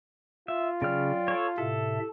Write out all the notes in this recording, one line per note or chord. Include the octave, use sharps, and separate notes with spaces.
F4 E5
C#3 F#3 D5 G5 F6
A4 C#5
A2 C3 A4 E5